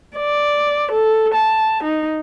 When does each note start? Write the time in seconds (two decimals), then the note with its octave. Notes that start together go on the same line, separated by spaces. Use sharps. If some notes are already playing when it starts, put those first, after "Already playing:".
0.17 D5
0.92 A4
1.35 A5
1.84 D#4